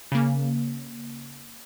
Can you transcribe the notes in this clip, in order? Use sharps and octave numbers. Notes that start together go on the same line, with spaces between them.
C#3 A#3